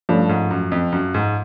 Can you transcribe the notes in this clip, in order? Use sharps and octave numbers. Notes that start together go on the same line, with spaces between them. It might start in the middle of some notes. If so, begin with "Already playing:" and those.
G2 F3 A3 C#4
G#2
F#2
F2
F#2
G#2